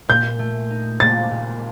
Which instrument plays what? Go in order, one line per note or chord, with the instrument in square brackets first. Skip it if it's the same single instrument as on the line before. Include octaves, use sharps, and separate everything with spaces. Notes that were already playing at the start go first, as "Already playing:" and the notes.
[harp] A#2 [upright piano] G6
[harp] A3
D#4
[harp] A#2 [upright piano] A6
[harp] A#2